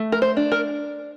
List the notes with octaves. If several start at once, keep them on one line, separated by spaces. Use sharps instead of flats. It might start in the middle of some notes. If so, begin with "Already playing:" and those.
Already playing: A3
A#4
C5
D4
A#4